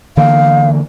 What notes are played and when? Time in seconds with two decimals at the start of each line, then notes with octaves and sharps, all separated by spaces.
0.17 D3 E3 A#3 F5